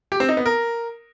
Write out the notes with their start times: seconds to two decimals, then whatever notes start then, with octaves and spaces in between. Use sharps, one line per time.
0.12 G4
0.20 C4
0.29 D#4
0.37 B3
0.46 A#4